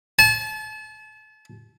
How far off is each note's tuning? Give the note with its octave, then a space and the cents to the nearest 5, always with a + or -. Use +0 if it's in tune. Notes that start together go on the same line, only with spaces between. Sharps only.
A5 -35